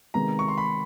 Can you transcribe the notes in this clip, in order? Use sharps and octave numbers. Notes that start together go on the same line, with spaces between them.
C3 D#3 G#3 B3 A#5
C#6
C6
B5